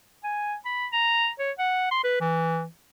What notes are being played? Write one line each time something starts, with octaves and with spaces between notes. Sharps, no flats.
G#5
B5
A#5
C#5
F#5
C6
B4
E3